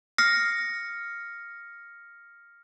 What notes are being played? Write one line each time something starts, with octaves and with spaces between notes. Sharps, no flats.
D#6 F6 A#6 C7 C#7